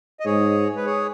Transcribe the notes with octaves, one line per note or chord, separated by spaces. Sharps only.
D#5
G#2 G#4 C#5
B4
G#4 C#5